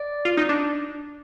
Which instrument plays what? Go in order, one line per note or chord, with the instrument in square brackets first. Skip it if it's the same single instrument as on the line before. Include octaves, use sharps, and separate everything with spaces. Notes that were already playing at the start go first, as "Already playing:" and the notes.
Already playing: [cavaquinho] D5
[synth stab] F4
D#4
D4